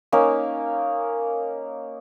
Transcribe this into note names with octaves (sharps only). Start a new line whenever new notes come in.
A#3 C#4 D#4